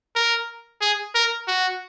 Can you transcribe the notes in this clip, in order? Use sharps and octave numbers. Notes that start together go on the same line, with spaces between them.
A#4
G#4
A#4
F#4